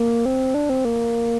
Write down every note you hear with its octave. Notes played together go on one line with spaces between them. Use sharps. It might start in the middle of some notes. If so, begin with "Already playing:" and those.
Already playing: A#3
C4
D4
C4
A#3